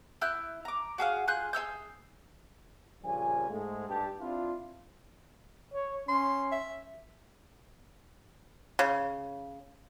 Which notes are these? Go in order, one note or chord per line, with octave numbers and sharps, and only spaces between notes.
E4 E6 F#6 G6
A#5 D6
F#4 G#4 A4 F5
F4 G#4 F#6 G6
G#4 C#5 E6 G6
A#1 C#3 F3 G3 G#5
G#2 G#3 A3
G2 G4 A5
C4 D4 E4 F4
C#5
C#4 C6
E5
C#3